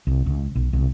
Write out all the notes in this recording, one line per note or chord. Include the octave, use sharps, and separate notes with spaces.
C2
C#2
B1
C2